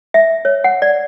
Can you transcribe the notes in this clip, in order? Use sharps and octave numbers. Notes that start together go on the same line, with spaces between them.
E5
C#5
F#5
D5